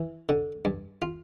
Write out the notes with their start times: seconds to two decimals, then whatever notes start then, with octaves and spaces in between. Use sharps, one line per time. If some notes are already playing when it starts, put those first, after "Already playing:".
Already playing: E3
0.29 D3
0.65 G2
1.02 F4